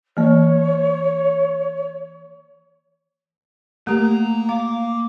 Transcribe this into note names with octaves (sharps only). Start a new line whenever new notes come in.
E3 A#3 C#5
A3 A#3 G4 A#4 A#5
F5 D6